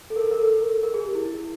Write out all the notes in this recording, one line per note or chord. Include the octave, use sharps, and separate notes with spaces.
A4
A#4
A4
A#4
A4
A#4
A#4
G#4
G4
E4
E4